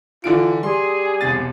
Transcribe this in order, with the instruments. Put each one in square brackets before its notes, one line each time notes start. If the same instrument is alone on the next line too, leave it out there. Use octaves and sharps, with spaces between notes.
[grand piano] D3 E3 D7 [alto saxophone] F4
[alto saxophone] G3 [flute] G#4 [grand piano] C6
[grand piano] E1 C2 A6